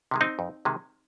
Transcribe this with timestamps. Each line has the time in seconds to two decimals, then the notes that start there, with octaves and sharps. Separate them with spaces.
0.11 C3 D#3 G#3
0.21 C4 D#4
0.39 F2
0.65 C3 D#3 G#3